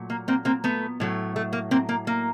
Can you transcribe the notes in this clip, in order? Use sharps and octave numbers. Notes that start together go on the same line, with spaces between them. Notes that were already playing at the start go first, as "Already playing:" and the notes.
Already playing: A#2 F#3 A3
A#3
A#3 C4
A#3 C4
A3 B3
A2 F#3 A3
A3
A#3
A#3 C4
A#3
A#3